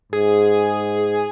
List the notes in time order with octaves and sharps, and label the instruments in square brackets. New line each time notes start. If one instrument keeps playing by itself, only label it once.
[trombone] G#2 [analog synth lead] G#4